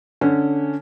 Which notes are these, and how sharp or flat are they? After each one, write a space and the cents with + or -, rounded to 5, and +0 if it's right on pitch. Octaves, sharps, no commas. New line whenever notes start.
D3 +0 C#4 +0